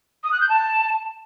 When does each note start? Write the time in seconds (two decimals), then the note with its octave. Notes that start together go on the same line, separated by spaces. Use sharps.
0.24 D#6
0.32 F#6
0.41 G6
0.49 A5